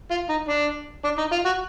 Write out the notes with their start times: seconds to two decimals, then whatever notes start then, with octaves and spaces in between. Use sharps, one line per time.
0.11 F4
0.29 D#4
0.48 D4
1.04 D4
1.18 D#4
1.32 F4
1.46 F#4